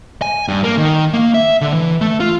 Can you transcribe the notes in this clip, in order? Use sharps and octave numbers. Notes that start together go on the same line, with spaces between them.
G#5
G2
A#3
D#3
A#3
E5
D3
E3
A3
F4